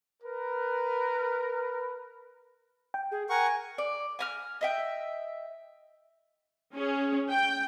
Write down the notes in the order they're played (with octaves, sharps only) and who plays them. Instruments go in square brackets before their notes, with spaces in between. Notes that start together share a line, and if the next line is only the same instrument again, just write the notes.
[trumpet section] A#4 B4
[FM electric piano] G5
[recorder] G#4
[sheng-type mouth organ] A#4 F#5 C#6 [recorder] G#5
[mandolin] D5
G#5 A#5 F6
D#5 E5 G5
[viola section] C#4 G#4
G5